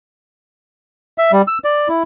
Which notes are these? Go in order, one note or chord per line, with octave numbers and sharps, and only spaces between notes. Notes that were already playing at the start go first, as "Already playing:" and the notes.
E5
G3
E6
D5
E4